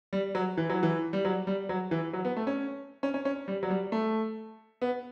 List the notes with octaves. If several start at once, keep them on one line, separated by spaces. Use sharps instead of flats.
G3
F#3
E3
F#3
E3
G3
F#3
G3
F#3
E3
F#3
B3
A3
C#4
C#4
C#4
C#4
G3
F#3
G3
A3
B3